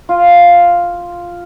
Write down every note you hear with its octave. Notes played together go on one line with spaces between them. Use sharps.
F4